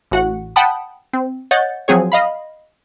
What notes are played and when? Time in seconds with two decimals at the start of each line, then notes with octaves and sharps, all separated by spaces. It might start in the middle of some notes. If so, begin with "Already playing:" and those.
0.11 A1 F#4 F#5
0.56 F#5 G5 A5 B5 D#6
1.13 C4
1.51 C#5 D#5 F#5 G6 A6
1.88 F3 F#3 C4 G#4 C#5
2.12 D#5 F5 B5